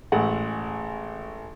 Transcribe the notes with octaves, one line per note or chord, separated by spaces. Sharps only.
A1 G#3 A3 F#5